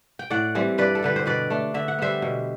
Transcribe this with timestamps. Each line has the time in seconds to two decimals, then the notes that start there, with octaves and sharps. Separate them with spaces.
0.19 G5
0.30 A2 D5 F#5
0.55 E3 G3 C4
0.78 G2 B4 D5
0.95 A4
1.03 D3 G3 B4
1.16 C5
1.26 B2 B4 D5
1.50 A3 D4
1.74 D3 E5
1.88 F#5
1.99 G3 B3 C5 E5
2.22 B2